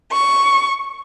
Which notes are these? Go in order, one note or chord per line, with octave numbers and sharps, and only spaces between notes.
C#6